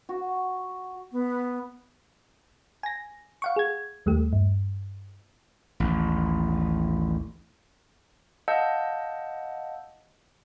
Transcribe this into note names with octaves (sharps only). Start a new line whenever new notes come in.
F#4
B3
G#5 A#6
F5 F#5 C#6
G#4 G#6
D#2 G3 A3 G4
G2
A1 D#2
D#5 F5 F#5 A5 E6 G6